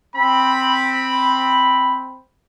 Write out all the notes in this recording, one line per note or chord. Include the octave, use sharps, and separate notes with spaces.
C4 B5